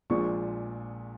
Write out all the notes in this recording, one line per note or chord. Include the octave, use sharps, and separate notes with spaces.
A#1 A#2 F3 G#3 C#6